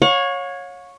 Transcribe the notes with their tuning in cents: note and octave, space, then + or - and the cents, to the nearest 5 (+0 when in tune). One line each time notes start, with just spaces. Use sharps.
C#5 -5 F5 +45